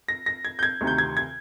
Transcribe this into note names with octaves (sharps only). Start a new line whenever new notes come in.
A#6
A#6
G#6
G6
G#6
D2 C3 D#3
G6
G#6
G#6